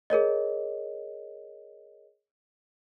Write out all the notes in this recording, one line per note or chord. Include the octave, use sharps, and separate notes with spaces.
G#4 A#4 C#5 D#5